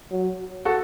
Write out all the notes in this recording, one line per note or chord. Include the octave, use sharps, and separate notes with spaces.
F#3
F#4 A4